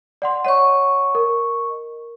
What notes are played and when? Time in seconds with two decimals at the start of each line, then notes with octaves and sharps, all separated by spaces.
0.22 D5 F#5 C6
0.45 C#5 D#5 F#5 C#6
1.15 A#4